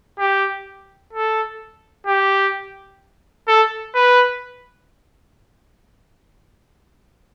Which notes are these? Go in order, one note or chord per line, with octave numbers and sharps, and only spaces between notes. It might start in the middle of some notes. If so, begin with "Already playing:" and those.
G4
A4
G4
A4
B4